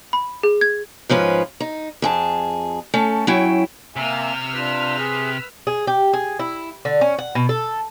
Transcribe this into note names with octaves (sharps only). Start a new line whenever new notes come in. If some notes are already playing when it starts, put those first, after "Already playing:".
B5
G#4
G#6
G#2 F3 C#4 B4
D#4
F2 G#4 A5
A3 C#4 A4
F#3 C#4 E4 G5
C3 A#3 E5 G#5 E6 F6
D4 F4 B4
G#4
G#4
G4
G#4
E4
D3
C#4
F#5
B2
A4